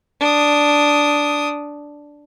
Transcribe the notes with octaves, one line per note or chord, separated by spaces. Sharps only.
D4 D#6